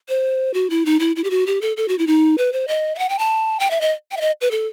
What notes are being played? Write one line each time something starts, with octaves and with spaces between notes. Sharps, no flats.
C5
F#4
E4
D#4
E4
E4
G4
F#4
G4
A4
A4
F#4
E4
D#4
B4
C5
D#5
E5
F#5
G5
A5
G5
E5
D#5
G5
E5
D#5
B4
A4